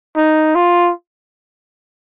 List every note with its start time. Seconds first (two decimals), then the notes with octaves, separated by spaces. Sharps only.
0.16 D#4
0.55 F4